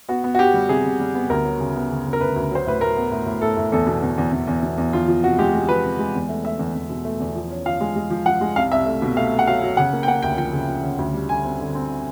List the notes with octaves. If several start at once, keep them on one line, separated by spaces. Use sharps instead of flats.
B3 F#4
B3
F#4
B3 G4
G3
C3 G#4
C3
G3
B3
D2 A#4
F#3
C#3
B3
C#3
C#3
A#4
D2 B4
D2
F#3 C5
A2 B4
A2 A#4
B3
A2
A2
A2 A4
A2
E2 A4
B2
E2
E2
E2
E2
B2
E2
F3 F4
F3
C3 F#4
G#3 G4
G#3
F3 B4
C3
G#3
E2
A3
A3 E5
E2
E2
B2
A3
E2
F3
C#4
F3 F5
G#3
G#3
F3
F3 F#5
G#3
C2 F5
C2 E5
A3
B2
A3 F5
A3
F#5
F#3 F5
F#3
C#3 F#5
A#3
G5
A#3 F#5
D2 G5
F3 G5
C#3
F3
C#3
D2
G3
D3 G#5
C4
D3
C4